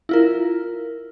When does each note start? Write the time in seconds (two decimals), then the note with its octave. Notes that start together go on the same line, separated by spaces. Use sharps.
0.09 E4 F4 A#4